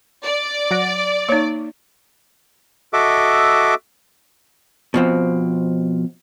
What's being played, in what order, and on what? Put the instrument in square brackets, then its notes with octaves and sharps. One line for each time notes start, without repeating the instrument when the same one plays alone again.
[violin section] D5
[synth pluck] F#3 F#5 A#6
[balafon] A#3 D#4 [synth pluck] C#5 C#6
[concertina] F#4 A4 D#5 E5 D6
[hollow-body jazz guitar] B2 F3 C4